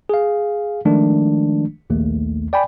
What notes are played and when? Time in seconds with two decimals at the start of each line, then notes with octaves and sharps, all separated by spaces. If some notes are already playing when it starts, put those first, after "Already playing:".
0.09 G#4 F5
0.85 D#3 F3 G#3 A3 D4
1.90 A#1 D#2 A3
2.53 D5 G5 G#5 B5